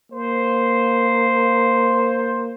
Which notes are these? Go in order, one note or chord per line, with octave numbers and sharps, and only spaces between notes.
A#3 C5